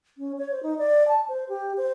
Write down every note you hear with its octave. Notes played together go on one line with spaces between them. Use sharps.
C#4
C#5
C5
D#4
D5
A5
C5
G4
C5